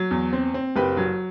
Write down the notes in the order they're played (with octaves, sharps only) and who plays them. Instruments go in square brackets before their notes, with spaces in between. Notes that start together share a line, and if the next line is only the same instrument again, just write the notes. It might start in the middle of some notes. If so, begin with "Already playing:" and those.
Already playing: [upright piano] F#3
E2
C4
C4
F#1 G4 B4
F#3